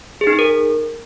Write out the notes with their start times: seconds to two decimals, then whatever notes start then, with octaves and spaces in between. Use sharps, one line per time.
0.21 G#4
0.27 D#4
0.33 G#4
0.39 A#4